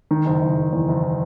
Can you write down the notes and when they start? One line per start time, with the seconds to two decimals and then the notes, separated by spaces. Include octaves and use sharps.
0.11 D#3
0.25 F#1
0.41 F#1
0.56 F#1
0.73 E2
0.88 F#1